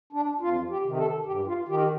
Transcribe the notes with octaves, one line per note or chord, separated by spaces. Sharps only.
D4
F2 F4
G4
C3 D#3
A4
G2 G4
F4
D#3 G4